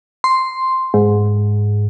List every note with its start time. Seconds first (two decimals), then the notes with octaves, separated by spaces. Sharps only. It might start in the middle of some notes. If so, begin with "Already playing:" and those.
0.24 C6
0.94 G#2